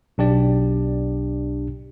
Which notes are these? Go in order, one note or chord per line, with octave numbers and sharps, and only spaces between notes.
B1 D4 G4 D5